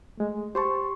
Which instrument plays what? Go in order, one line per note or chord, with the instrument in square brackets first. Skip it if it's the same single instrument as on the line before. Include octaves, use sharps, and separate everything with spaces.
[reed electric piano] G#3 A3
[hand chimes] G4 C6 C#6 [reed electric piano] C5 A5